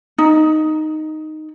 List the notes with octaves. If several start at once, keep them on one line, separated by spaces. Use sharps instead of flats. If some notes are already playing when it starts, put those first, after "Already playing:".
D#4